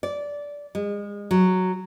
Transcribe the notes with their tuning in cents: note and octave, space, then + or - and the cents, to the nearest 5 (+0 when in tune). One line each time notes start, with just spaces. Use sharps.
D5 -15
G#3 -30
F#3 +0